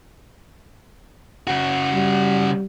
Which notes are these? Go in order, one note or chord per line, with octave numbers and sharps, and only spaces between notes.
C#3 F#4
G3